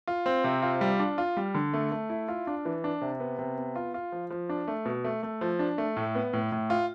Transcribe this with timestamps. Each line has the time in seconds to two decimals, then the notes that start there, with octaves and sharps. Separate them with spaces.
0.07 F4
0.26 C4
0.44 C3
0.63 F4
0.81 G3
1.00 D4
1.18 F4
1.37 G3
1.55 D3
1.73 A3
1.92 A3
2.10 E4
2.28 F4
2.47 D4
2.65 E3
2.84 D4
3.01 C3
3.20 B3
3.39 C3
3.58 B3
3.76 F4
3.94 F4
4.12 F3
4.30 F3
4.49 D4
4.68 A3
4.86 B2
5.04 A3
5.23 A3
5.41 F3
5.59 D4
5.78 A3
5.96 A2
6.15 B3
6.33 A2
6.52 A2
6.70 F4